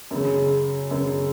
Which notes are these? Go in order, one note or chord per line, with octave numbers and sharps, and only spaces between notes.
F#2 C#3
F#2 C#3